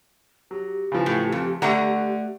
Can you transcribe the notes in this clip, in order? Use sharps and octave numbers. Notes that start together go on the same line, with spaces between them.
F#3 G4
C#3 E3 F3
A2
F2
D3 A3 F#5 A#5